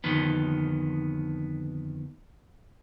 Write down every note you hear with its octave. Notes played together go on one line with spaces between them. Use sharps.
F2 D3 D#3 B3